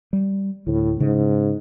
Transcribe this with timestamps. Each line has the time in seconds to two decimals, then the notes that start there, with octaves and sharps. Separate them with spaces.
0.13 G3
0.67 D2 A2
1.00 G#2 C#3